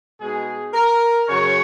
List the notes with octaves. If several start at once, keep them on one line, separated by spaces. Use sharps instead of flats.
B2 G#3 D#4 G#4
A#4
F#2 C#3 F#3 C#5